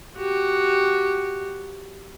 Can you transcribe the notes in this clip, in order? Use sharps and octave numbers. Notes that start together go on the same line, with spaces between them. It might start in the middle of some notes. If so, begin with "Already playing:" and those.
F#4 G4